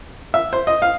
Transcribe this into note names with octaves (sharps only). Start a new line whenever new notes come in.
E5
C5
D#5
F5